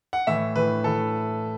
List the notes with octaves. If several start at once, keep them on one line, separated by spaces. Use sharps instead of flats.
F#5
A2 E3 E5
A2 E3 B4
A2 E3 A4